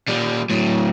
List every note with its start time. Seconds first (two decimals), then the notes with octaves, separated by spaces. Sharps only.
0.08 A#2 G3
0.50 A2 F#3